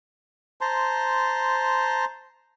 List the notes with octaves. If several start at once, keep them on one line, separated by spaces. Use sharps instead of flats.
C5 A5 A#5 C6